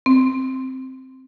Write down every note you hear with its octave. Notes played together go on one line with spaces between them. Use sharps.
C4